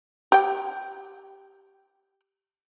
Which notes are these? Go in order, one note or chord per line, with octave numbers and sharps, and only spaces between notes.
G4 G5